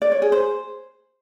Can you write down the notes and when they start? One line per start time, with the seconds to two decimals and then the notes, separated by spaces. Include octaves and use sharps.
0.02 D5
0.12 C#5
0.22 G#4
0.32 C5